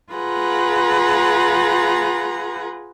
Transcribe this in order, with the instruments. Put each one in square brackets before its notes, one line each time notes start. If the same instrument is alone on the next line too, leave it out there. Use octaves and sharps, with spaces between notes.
[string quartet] F4 G#4 B4 F#5 A#5